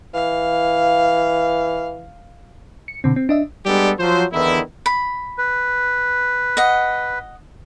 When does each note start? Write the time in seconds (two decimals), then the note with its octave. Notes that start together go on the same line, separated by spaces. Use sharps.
0.14 E3 F5
2.88 C#7
3.04 B2 D3 C4
3.16 C4
3.29 D4 D#5 E5
3.66 G3 G#3 B3 D4 G4 A4
3.99 F3 F#3 C5
4.33 E2 D3 D#3 B3 E4
4.86 B5
5.38 B4
6.57 D#5 F#5